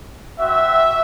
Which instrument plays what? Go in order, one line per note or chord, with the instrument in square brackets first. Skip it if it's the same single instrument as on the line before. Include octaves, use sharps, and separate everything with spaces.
[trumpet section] C4 F#4 E5